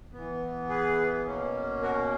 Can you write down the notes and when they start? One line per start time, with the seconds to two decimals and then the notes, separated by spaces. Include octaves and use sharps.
0.13 E3 B3
0.69 G#4 B4
1.26 B2 A#3 C#4
1.82 F#4 A#4